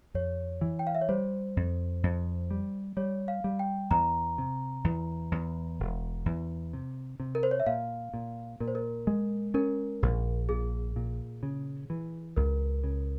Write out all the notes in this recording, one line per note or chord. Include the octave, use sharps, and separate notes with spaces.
F2 C#5
E3
G5
F5
E5
C#5
G3 C5
F2
F2
G3
G3 C#5
F5
G3
G5
E2 A#5
C3
E2
E2
E1
E2
C3
C3
A#4
C5
C#5
E5
A#2 F5
A#2
A#2 A#4
C5
A#4
G#3
C#4 A#4
A#1
A#2 G#4
A#2
C#3
E3
C#2 A#4
C#3